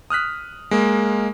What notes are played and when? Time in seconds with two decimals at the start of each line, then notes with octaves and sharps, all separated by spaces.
0.10 D#6 F6 F#6 B6
0.71 G#3 A#3